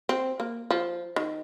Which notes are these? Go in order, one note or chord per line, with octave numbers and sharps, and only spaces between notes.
C4
A#3
F3
D#3